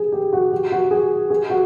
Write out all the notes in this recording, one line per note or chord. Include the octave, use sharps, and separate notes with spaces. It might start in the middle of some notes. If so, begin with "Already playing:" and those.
Already playing: G#4
G4
F#4
G4
F#4
G#4
G#4
F#4